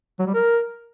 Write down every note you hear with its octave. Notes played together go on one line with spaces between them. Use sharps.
F#3
G3
A#4